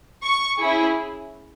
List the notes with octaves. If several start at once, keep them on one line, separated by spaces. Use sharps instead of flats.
C#6
C#4 E4 G#4